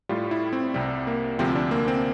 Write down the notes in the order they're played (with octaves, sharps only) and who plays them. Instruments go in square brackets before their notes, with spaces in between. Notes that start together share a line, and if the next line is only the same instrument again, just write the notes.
[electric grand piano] A2 G3 F4
E4
C4
C2 C3 G3
A#3
D2 C3 F3 C4
D4
A#3
C4